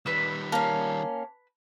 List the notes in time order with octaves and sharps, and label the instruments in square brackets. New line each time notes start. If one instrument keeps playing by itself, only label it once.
[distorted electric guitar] D#3 G3 [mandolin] B4 E6
[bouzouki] A#3 C#4 [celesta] A5